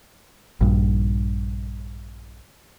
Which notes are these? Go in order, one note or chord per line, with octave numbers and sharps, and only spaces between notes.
A#1 G2